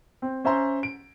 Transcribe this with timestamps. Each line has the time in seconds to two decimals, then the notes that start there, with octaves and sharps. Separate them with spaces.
0.22 C4
0.44 C#4 C5 E5 A#5 C6
0.83 D7